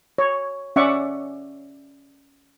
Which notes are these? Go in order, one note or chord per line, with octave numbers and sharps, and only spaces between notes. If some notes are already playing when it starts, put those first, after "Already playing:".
C#5
C#4 D5 E5 F#5 C#6 D6